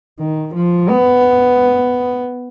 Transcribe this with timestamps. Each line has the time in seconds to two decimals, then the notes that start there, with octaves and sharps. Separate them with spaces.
0.19 D#3
0.55 F3
0.89 B3